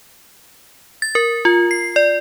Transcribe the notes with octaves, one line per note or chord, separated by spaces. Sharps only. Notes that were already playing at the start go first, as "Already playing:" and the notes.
A6
A#4
F4
C7
D5